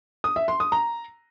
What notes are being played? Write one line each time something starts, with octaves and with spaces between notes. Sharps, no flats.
D#6
E5
C6
D#6
A#5